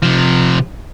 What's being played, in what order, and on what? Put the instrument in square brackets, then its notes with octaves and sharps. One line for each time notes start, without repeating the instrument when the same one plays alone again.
[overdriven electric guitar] C3 F3